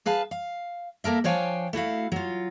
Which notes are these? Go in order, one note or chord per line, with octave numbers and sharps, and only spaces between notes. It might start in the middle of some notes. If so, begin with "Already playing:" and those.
G#4 B4 F5 A5
F5
A#3 A4 A#4 E5
F3 D4 C#5 F5 G5 G#5
A3 E4 F#4 F5
F#3 F4